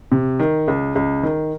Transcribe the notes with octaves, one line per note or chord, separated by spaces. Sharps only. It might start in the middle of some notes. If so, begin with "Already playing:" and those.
C3
D#3
C#2
C#2
D#3